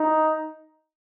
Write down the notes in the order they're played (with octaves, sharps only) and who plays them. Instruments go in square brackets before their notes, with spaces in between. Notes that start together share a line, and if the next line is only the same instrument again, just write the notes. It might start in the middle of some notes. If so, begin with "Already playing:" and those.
Already playing: [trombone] D#4